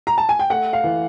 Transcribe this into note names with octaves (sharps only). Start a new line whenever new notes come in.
A#5
A5
G#5
G5
A3 F#5
F5
E3